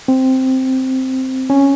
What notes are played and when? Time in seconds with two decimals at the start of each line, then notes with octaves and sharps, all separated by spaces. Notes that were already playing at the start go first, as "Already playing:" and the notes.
0.08 C4
1.50 C#4